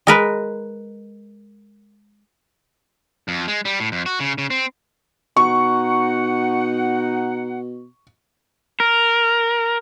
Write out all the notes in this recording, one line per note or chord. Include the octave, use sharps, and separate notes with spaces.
G#3 A#4 B4
F2
G#3
G3
A2
F2
F#4
C#3
C#3
C4
B2 D#4 F#5 C#6
A#4